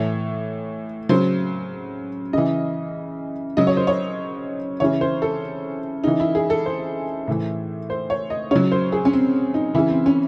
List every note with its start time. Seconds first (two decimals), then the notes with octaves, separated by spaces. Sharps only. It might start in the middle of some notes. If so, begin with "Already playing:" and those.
Already playing: A2 E3 C#5
1.09 C#3 F#3 C5
2.33 C#3 E3 D#5
3.57 C#3 F#3 D#5
3.67 C#5
3.77 C5
3.87 C#5
4.80 C#3 E3 C#5
5.01 C5
5.22 A4
6.04 C#3 E3 D#4
6.20 E4
6.35 G#4
6.50 A4
6.66 C5
7.28 A2 E3
7.90 C5
8.10 C#5
8.30 D#5
8.51 C#3 F#3 C#5
8.72 C5
8.92 G#4
9.05 C#4
9.13 C4
9.54 D#4
9.75 C#3 E3 E4
9.90 C4
10.06 C#4